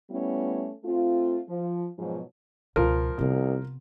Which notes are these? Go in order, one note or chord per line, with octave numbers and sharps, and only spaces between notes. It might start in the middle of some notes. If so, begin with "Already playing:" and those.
G3 A3 B3 C#4 E4
A3 C4 F4
F3
G#2 B2 F3 F#3
C#2 B2 F3 F4 A#4
C2 C3 B3